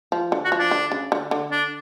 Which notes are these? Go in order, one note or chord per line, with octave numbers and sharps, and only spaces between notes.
F3
D3
F#4
F3
D4
D3
C#3
D3
D3
D4